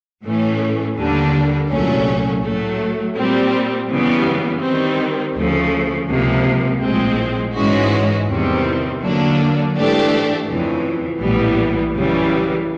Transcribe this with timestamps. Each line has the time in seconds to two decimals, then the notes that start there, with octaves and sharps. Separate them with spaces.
0.24 A2 E3 A3 C#4
0.97 D#2 D3 G3 A#3 D4
1.70 C2 A#2 F#3 A3 C#4
2.44 A2 F#3 A3
3.16 A#2 G3 C4
3.89 F#2 C#3 E3 G3 B3
4.63 D#3 G3 C4
5.36 D2 C#3 F3 A3
6.09 C#2 C3 F3 A#3
6.81 A#1 A2 F3 G#3 C4
7.55 G#2 E3 G#3 C#4 F#4
8.28 E2 C3 D#3 G3 C4
9.01 D3 F#3 A#3 D4
9.74 G#2 E3 A3 D4 G4
10.47 F2 C#3 E3
11.20 A#1 A2 E3 G3 B3
11.93 F#2 C#3 E3 G3